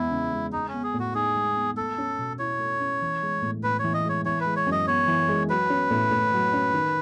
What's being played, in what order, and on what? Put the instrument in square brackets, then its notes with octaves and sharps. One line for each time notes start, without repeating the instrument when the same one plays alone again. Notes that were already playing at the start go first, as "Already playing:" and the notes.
Already playing: [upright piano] E2 G#3 B3 [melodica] E4
[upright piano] C#3
G#3
[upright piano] G#3 [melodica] D#4
[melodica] C#4
[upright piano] B3
[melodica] G#4
[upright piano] A2
[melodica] F#4
[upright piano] D#4 [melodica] G#4
[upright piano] G#3
B3
[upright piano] A3 [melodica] A4
[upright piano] C#4
B2
[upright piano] E4 [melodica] C#5
[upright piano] A3
C#4
E3
G#3
A2
[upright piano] A2 [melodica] B4
[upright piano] E3 [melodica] C#5
[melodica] D#5
[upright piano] G#3 [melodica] C#5
[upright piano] E3 [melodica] C#5
[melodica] B4
[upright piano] G#3
[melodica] C#5
[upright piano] F#2
[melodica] D#5
[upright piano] B3 [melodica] C#5
[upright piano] E3
G#3
[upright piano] F#3 [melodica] B4
[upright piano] C#4
A2
A2
F#3
C#4
D#3